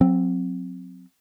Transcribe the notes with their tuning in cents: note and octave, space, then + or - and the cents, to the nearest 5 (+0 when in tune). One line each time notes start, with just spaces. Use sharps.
F#3 -25 C4 +0